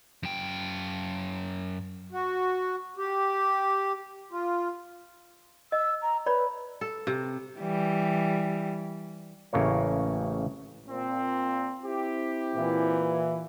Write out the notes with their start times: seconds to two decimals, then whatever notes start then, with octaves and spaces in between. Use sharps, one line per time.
0.23 F#2 G5
2.12 F#4
2.97 G4
4.31 F4
5.72 D#5 E6
6.02 A#5
6.26 B4 C#5 D5 B5
6.81 A4
7.07 C3
7.60 E3 G3
9.53 A1 C#3 A3 A#3 C#5
10.89 A#2 C4
11.84 C4 E4 G4
12.54 A#2 E3